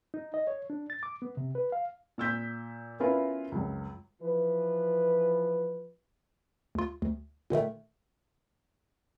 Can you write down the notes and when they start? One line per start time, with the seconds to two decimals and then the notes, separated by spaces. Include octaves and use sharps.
0.14 D#4
0.34 D#5
0.47 C#5
0.70 D4
0.90 A6
1.03 D6
1.22 B3
1.37 C3
1.55 B4
1.72 F5
2.18 A#2 E6 G6 B6
3.00 B3 C#4 E4 F4 A#4 B4
3.52 C#2 F#2
4.22 E3 F3 B4
6.75 D2 F4
7.02 D2
7.50 A#2 D3 D#3 A3